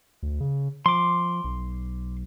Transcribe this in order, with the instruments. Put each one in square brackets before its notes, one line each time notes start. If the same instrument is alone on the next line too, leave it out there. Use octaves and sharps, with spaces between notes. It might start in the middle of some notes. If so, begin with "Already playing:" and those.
[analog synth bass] D2
C#3
[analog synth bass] F3 [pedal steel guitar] C6 D6
[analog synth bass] B1